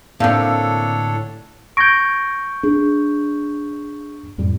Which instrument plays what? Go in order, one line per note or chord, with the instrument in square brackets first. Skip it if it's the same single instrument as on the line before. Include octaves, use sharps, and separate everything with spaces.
[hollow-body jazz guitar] A2 D3 [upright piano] A#3 C4 [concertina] D4 A4 C#5 [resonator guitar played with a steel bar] F5
[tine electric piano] C#6 G6 [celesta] G#6 A#6 D7
[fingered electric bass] D4 [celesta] G#4
[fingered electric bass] F2 A2 G3